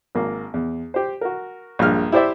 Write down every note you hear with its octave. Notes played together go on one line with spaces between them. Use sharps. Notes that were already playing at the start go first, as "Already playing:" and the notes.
G#1 A#3
E2
G4 C5
F#4 A#4
A#1 G2 G#3 F6
E4 G4 C5 D5 E5